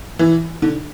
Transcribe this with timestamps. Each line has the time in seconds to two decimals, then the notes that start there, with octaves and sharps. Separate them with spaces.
0.19 E3
0.62 D3